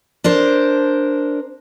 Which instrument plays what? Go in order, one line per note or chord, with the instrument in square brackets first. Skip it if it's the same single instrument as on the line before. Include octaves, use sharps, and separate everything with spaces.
[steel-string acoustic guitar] D4 A#4 C5